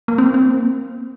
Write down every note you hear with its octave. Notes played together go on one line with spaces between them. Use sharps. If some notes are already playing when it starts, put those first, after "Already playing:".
A#3
C4
C4
A#3